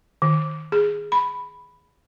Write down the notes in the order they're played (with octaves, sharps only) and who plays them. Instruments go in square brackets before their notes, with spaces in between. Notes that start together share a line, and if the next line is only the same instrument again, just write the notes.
[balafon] D#3
G#4
B5